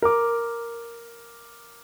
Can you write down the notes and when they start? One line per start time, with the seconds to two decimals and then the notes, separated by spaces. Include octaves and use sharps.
0.02 A#4 D6